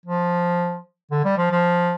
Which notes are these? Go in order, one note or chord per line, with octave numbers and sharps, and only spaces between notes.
F3
D3
G3
F3
F3